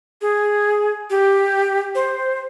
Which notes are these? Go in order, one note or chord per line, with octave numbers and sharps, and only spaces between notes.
G#4
G4
C5